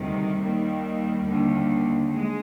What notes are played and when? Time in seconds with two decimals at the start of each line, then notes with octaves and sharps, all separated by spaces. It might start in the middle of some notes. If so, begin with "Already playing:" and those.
Already playing: D2 C3 D#3 G3
0.41 D#2 D#3
1.26 D#2 D3
2.12 G#3